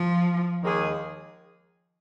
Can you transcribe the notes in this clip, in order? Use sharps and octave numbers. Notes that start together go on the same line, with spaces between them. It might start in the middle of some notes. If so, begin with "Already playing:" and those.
Already playing: F3
D#2 D#3 G#3 D#4 G#4